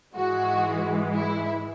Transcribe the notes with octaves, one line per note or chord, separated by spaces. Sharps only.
G#2 E3 G#3 F#4
E4